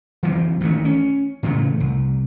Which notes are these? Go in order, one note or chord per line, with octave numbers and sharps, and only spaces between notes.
E3 F#3 C4
A1 D#3 G#3 A3
C#4
A2 C#3 E3 A3
C2